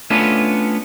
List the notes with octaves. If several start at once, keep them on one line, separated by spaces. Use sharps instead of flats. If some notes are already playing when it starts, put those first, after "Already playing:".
A3 B3 C#4 D4 F4